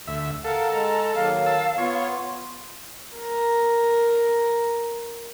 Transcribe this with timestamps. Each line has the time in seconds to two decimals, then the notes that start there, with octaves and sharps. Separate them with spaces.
0.07 D2 E5
0.44 A4 A#4 F5 F#5
0.70 G#3 A#5
1.15 D#3 F#3 A#3 F5
1.46 A5 E6
1.78 B3 F4 C#5
3.15 A#4 A#5